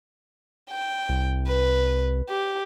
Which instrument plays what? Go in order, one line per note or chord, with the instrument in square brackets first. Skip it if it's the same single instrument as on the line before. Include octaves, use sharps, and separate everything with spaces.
[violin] G5
[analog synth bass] C2
[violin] B4
G4